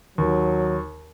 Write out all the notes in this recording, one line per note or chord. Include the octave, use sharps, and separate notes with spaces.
D#2 F#3